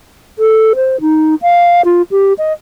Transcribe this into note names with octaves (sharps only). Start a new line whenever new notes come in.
A4
C5
D#4
F5
F4
G4
D#5